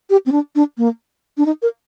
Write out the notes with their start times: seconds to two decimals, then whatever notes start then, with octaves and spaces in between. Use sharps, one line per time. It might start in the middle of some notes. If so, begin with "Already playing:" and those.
0.10 G4
0.26 C4
0.32 D4
0.55 D4
0.77 A#3
1.37 D4
1.46 D#4
1.62 A#4